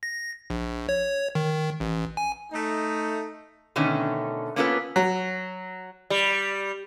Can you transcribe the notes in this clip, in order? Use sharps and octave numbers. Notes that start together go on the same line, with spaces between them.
A#6
A#1
C#5
D#3
A1
G#5
A3 D#4
B2 D3 D#3 A3 C#4
A#3 B3 C#4 F4 A4 B4
F#3
G3